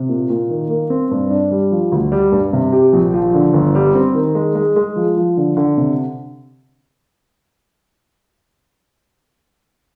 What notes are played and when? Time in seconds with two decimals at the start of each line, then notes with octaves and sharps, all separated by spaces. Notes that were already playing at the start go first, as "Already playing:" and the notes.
Already playing: C3
0.09 A#2
0.30 A#2
0.50 D#3
0.70 A#3
0.90 C4
1.11 G2
1.30 D4
1.51 G3
1.71 F3
1.92 D2
2.12 G3
2.32 G2
2.53 C3
2.72 G4
2.93 A#1
3.14 F3
3.34 D3
3.53 G1
3.75 G3
3.95 C4
4.15 D#3
4.35 G#3
4.55 G#3
4.76 G#3
4.96 F3
5.17 F3
5.37 D3
5.57 D3
5.77 C3